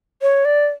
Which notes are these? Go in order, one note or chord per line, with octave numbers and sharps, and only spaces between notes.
C#5
D5